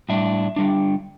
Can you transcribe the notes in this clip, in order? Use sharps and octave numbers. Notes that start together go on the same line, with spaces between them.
A2 G3 D4 E5
D3 G3 D4